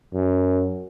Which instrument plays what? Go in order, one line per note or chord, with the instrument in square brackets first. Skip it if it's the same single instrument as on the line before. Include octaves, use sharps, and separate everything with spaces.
[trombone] F#2